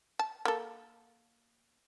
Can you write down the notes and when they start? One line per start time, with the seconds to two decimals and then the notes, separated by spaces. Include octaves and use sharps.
0.19 A5
0.45 A#3 A4